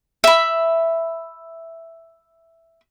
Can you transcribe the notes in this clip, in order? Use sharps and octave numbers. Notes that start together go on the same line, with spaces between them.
E5 B5